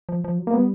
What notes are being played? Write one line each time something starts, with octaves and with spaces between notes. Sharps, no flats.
F3
F3
F#3
A#3
G3 B3